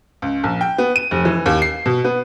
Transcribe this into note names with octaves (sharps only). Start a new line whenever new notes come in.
C#2
A#1
G5
B3
D#7
F1
E3
D#2
C7
B2
B3